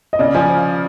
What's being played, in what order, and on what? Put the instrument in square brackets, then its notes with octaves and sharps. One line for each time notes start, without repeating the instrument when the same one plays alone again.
[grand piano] D#5
[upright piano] C#3 [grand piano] D5
[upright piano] F3 [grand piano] G#5